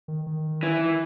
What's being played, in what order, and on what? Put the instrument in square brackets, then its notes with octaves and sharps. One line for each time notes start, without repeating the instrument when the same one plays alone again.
[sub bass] D#3
D#3
[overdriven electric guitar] E3